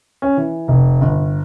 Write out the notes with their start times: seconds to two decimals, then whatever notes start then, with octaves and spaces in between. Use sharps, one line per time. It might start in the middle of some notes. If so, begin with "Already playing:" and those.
0.22 C#4
0.37 E3
0.68 F1
1.01 G1